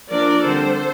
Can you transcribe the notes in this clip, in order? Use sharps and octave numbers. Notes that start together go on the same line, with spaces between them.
F3 A#3 D4 A#4 D5
D3 G3 C4 A4 C5